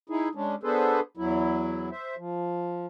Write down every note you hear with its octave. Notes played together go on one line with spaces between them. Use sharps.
D#4 E4 G#4
G#3 C#4 D4
B3 D4 G#4 A4 B4 C5
E2 F#3 E4
C5 E5
F3